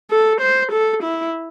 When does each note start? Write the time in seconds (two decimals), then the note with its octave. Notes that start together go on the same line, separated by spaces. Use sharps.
0.11 A4
0.41 C5
0.72 A4
1.03 E4